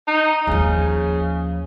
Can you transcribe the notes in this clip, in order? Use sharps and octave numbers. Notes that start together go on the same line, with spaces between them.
D#4
D#2 C#3 F3